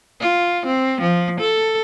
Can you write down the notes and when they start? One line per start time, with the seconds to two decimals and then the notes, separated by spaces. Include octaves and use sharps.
0.21 F4
0.66 C4
1.01 F3
1.40 A4